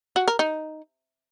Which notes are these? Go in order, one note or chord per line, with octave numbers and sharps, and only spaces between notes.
F#4
A#4
D#4